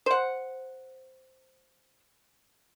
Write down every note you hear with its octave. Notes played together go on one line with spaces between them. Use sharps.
C5 F#5